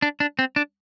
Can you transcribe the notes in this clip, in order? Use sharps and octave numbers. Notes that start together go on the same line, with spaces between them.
D4
D4
C4
D4